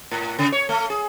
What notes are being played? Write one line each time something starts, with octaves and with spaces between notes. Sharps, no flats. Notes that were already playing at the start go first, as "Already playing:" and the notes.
A2
C#3
C#5
A3
G#4